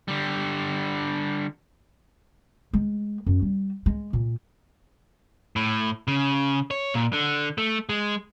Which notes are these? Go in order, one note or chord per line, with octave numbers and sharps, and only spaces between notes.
D3 G3
G#3
F#2
G3
G#3
A#2
A2
C#3
C#5
A#2
D3
A3
G#3